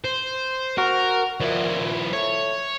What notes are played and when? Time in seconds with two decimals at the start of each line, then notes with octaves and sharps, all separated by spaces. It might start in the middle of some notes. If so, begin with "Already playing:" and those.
0.05 C5
0.78 F#4 A#4
1.40 A#2 F3 E4
2.13 A3 C#5